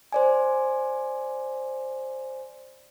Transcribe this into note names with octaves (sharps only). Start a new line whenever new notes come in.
C5 D5 G#5